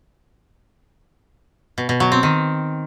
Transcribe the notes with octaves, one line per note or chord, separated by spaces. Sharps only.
B2
B2
F#3
C4
D#3